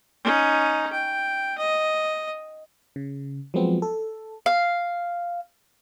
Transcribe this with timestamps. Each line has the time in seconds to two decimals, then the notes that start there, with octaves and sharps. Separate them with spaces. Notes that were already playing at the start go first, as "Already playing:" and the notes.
0.24 C#4 D#4
0.92 G5
1.58 D#5
2.96 C#3
3.54 F3 F#3 G#3 B3 C4
3.82 A4
4.46 F5